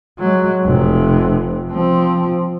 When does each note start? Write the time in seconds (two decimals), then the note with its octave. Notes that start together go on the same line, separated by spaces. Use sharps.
0.19 F#3 G#3
0.64 F1 C3
1.71 F3 C4